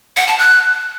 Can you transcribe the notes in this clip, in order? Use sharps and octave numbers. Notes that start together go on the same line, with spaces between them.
F#5
A5
F#6